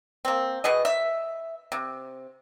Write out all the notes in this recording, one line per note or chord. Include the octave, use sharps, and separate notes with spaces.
A#3 C4
B2 B3 G#4 D#5
E5
C3